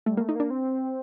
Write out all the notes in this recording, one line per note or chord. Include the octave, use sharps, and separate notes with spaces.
G3 A3
A#3
A3
D#4
A#3 D4
C4